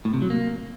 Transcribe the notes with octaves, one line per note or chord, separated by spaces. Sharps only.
A2
C3
F#3
A#3